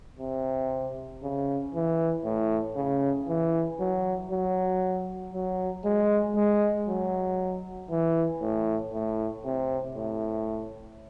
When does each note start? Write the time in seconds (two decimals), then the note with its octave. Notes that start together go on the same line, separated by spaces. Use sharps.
0.20 C3
1.23 C#3
1.74 E3
2.25 A2
2.76 C#3
3.29 E3
3.80 F#3
4.31 F#3
5.34 F#3
5.85 G#3
6.36 G#3
6.87 F#3
7.90 E3
8.42 A2
8.94 A2
9.45 C3
9.96 A2